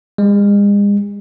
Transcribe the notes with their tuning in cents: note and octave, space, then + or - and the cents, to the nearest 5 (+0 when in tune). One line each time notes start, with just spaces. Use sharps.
G#3 -40